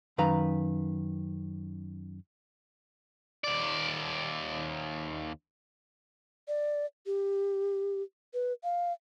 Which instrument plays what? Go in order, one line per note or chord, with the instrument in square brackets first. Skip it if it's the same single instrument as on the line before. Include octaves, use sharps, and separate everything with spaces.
[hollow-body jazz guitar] F#2 D#3 B4 F5 A#5
[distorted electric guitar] D#2 D5
[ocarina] D5
G4
B4
F5